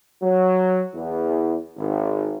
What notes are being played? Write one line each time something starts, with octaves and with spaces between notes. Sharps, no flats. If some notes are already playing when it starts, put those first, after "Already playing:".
F#3
E2
G#1